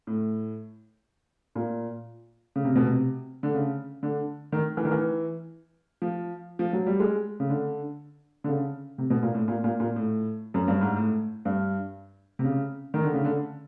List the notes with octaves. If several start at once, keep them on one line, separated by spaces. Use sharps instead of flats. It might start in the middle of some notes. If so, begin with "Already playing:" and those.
A2
A#2
C#3
C3
B2
C3
D3
C#3
D3
D#3
E3
D#3
E3
F3
F3
F#3
G3
G#3
C#3
D3
D3
C#3
C3
B2
A#2
A2
A#2
A#2
A#2
A2
F#2
G2
G#2
A2
G2
C3
C#3
D#3
D3
C#3
D3